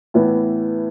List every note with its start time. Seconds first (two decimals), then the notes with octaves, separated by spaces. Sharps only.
0.14 A2 E3 B3